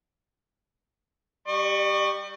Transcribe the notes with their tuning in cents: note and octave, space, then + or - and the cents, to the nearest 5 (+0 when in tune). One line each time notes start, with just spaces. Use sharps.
G3 +0 D5 +45 C#6 +0